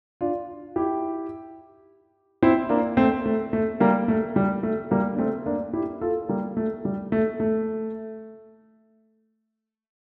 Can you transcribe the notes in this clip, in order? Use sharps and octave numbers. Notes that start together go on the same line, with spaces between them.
D4 F4
E4 G4
C4 E4
A#3 D4
A3 C4
A3
A3
G3 A#3
A3
G3
A3
G3 A#3
D4
A3 C4
A#3 D4
E4 G4
F4 A4
G3 A#3
A3
G3
A3
A3